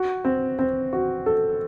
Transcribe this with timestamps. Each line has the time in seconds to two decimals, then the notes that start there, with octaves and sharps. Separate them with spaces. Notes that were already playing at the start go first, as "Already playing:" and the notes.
Already playing: F#4
0.25 C4
0.59 C4
0.93 F#4
1.26 A4